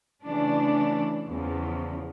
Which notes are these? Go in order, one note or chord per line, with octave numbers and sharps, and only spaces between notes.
C#3 E3 A3 D4
E2 C#3 F3